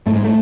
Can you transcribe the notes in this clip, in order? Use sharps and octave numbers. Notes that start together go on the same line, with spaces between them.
G#2 A3
G#3
A3